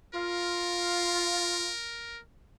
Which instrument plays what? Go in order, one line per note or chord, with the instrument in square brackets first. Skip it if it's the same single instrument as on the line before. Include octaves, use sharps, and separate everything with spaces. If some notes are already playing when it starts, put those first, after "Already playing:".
[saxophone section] F4 [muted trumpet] A#4